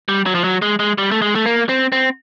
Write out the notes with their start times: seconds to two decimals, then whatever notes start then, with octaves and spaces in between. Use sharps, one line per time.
0.09 G3
0.26 F#3
0.35 F3
0.44 F#3
0.62 G#3
0.79 G#3
0.98 G3
1.11 A3
1.22 G#3
1.35 A3
1.46 A#3
1.69 C4
1.92 C4